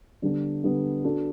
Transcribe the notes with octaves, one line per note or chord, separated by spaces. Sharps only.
D3 G3 B3 D4
D3 G3 B3 D4
B3 D4 F#4 A4